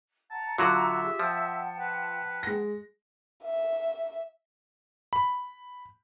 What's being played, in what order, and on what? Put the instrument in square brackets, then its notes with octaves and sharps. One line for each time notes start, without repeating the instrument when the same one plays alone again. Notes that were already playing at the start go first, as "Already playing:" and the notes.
[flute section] F#5 A#5 [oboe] A5
[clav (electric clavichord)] D3 F#3 F#4 [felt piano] F4 [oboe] E5
[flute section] G4 G#4
[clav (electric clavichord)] F3 [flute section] F#5 G5 A5
[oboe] B4
[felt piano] G#3 A#6
[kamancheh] E5
[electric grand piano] B5